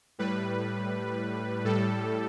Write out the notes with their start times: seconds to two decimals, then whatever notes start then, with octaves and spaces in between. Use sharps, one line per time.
0.19 A2 G3 B4
1.64 A2 G3 A4